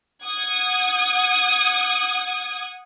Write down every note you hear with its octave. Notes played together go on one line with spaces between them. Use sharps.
F#5 D#6 G#6